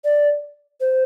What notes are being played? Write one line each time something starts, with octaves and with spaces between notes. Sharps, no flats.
D5
C5